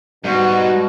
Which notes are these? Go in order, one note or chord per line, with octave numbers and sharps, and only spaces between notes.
G#2 B2 G3 F#4